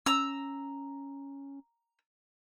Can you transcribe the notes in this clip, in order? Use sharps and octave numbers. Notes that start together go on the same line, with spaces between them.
C#4 A#5 E6